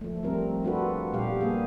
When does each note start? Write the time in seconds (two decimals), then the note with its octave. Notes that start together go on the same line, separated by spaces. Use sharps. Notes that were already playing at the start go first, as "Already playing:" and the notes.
0.01 F3 A3
0.23 F3 G3 C4 A#4
0.64 D4 F4 F#4 A4 B4
1.12 A#2 G3 B3 G4 F5
1.41 A#3 G#4